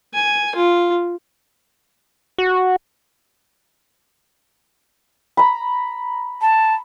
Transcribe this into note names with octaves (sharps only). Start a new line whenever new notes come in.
G#5
F4
F#4
A#5 B5
A5